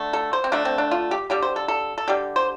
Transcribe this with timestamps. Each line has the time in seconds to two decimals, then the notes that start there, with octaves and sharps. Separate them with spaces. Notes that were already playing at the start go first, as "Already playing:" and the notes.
Already playing: D3 A3
0.13 A4
0.33 C5
0.44 C4
0.52 D3 A3 D4
0.65 C4
0.78 D4
0.91 F4
1.11 G4
1.30 D3 G3 G4
1.42 C5
1.56 A4
1.68 A4
1.98 A4
2.08 D3 G3 G4
2.36 C5